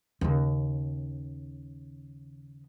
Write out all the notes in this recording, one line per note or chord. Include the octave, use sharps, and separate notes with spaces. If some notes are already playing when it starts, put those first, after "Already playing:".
D#2 C#3